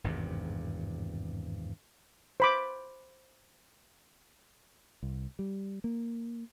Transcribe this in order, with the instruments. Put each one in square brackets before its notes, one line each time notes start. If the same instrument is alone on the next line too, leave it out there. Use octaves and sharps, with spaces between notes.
[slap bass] G#1 E2 G2 C3
[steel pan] C5 B5 D6
[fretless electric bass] C2
G3
A#3